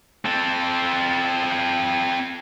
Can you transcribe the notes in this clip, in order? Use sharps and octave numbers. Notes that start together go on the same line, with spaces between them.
C4 A4